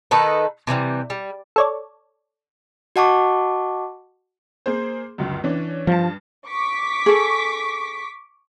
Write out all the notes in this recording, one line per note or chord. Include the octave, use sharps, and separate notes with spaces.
D#3 D#4 A4 B4
C3 E3 F3 G3
G3
A4 C#5 D5
F#4 D#5 F#5 A5 C#6 D6
A#3 G#4 C5
G1 C#2 F#2
E3 C#4 D4
G2 F3 A5
C#6 D6 B6
G#4 A4